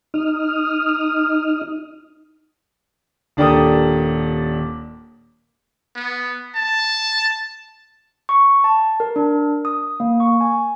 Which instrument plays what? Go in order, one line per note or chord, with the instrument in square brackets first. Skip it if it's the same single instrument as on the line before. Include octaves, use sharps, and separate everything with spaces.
[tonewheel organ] D#4 D#6 F6
[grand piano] D#1 D4 G4 A4 A#4 D#6
[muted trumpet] B3
A5
[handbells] C#6
A5
A#4
D4
D#6
A#3
C#6
G#5